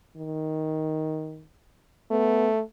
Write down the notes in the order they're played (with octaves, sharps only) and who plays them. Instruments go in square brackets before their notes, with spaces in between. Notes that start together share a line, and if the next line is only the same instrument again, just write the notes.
[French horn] D#3
[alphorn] A3 [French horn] B3